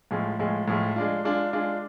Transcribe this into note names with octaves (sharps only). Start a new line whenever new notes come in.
A2 F3 G#3
A2 F3 G#3
A2 F3 G#3
G#3 D4 F4
G#3 D4 F4
G#3 D4 F4